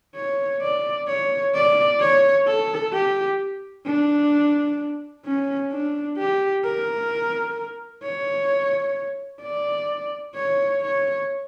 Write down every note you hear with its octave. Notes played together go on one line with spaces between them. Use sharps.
C#5
D5
C#5
D5
C#5
A4
G4
D4
C#4
D4
G4
A#4
C#5
D5
C#5
C#5